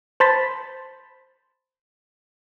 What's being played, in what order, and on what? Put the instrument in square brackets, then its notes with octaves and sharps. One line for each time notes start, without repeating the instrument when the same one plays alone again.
[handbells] C5 A5 B5 C6 A6 B6